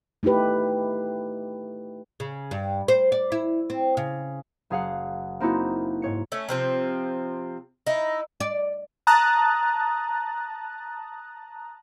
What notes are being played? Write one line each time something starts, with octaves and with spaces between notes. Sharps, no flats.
A3 D#4 E4 G4 B4
C#3
G2
C5
D5
E4
C4
C#3
F#1 G#4 F5 F#5
A#3 C4 D#4 E4 F#4 A4
G#2 C#5 C#7
A3 C#4
C3 F3 C4
D#4 E4
D5
A5 A#5 D#6 F#6 A6